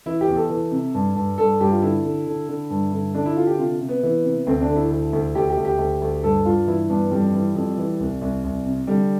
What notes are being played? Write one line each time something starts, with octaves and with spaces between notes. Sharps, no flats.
E3 E4
G4
E2
A4
E3
C3
G2
G2
G2 A4
G2 G4
F4
D3 E4
D3
D3
D3
G2
D3
D3 D4
E4
D3 F4
G4
C3 F4
C3
B3
E3
C3
D2 C4
D4
D3
E4
D2
D2
D2 G4
G4
D2
G4
D2
D2
G2 A4
G2 F4
E3 E4
G2 B3
F2 G3
E3
F2
E3
C2
C2
C2
C3
D3 G3